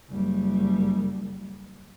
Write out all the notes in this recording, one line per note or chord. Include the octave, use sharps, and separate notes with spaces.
F#1 G3